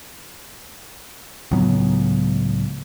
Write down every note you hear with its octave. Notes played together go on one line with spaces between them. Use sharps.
C#2 A2 F#3 B3